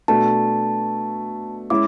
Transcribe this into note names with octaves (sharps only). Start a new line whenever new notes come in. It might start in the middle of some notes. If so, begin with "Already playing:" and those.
B2 A3 D4 A5
G#3 C#4 E4 D6